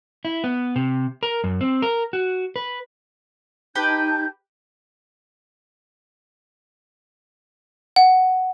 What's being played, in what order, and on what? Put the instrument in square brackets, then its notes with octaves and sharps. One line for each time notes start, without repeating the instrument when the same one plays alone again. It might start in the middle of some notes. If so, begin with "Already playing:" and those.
[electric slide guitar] E4
B3
C3
A#4
F#2
C4
A#4
F#4
B4
[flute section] D#4 A5 G6 [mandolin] G4 B4 G5
[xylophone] F#5